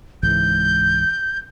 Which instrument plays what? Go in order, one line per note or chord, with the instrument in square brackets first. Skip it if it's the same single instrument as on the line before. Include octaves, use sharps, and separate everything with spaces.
[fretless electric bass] C#2 G#2 E3 [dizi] G6